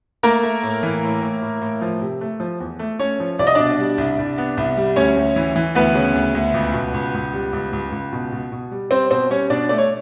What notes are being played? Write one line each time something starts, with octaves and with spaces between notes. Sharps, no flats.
A3 A#3 A#4
A3
A2
E3
A2
A2
A2
A2
F3
C3
A3
F3
E2
A3
A3 C#4 C#5
F3
C2 D5
D#5
B2 D4 D5
G3
C2
C2
B3
C2
G3
D2 C#4 C#5
D2
E3
E3
D2 B3 B4
C#3
D2
D2
C#2
B2
C#2
C#2
G3
C#2
C#2
C#2
B2
B2
B2
G3
G3 C4 C5
B2 C4 C5
G3 C#4 C#5
B2 D4 D5
A3 D5
C#5